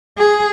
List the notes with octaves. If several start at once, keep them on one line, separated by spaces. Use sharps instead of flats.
G#4